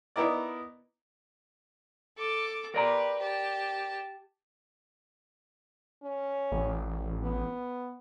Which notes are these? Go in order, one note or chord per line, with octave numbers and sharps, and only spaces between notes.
B3 D#4 E4 A#4 D5
A4 D6
G4 A#4 B4 D5 A#5
G4 A5
C#4
A1
B3